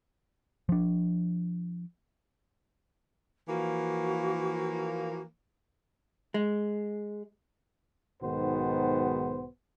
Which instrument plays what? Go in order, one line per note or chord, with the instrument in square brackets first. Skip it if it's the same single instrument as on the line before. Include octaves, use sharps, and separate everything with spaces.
[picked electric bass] F3 D4
[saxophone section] E3 F3 A#3 [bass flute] F#4
[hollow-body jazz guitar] G#3
[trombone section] B1 G#2 D#3 B3 F#4 C5